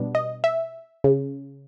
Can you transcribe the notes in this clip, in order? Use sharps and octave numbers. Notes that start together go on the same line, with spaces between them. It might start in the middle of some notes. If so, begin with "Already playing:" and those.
Already playing: B2 G3 B3 D4
D#5
E5
C#3